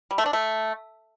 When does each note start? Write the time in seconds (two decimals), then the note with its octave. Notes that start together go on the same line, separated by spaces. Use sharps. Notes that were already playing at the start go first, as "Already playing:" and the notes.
0.11 G3
0.18 A3
0.26 D4
0.33 A3